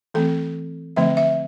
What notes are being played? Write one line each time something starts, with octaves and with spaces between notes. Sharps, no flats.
E3 A3 C4 A4
D3 F3 A3 C4 E5
E5